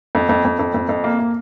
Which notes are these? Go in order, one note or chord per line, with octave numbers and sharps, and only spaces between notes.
F2
F2
F2
F2
F2
F2
A#3
A#3